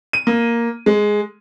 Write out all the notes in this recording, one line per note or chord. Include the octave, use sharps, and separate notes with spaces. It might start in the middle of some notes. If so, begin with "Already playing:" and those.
D#7
A#3
G#3